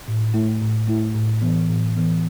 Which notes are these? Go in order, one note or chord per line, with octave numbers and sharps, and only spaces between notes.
A2
A3 E4
A2
A3 E4
A2
E3 B3
A2
E3 B3